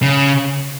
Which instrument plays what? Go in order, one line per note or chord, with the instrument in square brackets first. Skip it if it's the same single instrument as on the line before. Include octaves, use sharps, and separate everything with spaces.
[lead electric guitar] C#3